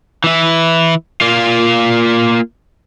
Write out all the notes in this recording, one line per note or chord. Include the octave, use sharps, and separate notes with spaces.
E3 E4
A#3 F4